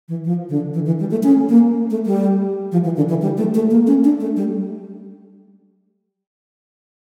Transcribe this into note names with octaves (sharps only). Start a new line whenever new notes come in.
E3
F3
D3
E3
E3
G3
A3
C#4
A#3
A3
G3
F3
E3
D3
E3
G3
A3
A3
A#3
C#4
D4
A3
G3